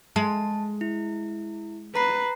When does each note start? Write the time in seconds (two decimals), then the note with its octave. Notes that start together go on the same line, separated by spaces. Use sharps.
0.16 G#3 A5
0.81 E4
1.96 B4 A#5 C7